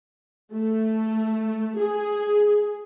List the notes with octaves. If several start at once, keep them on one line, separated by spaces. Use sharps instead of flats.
A3
G#4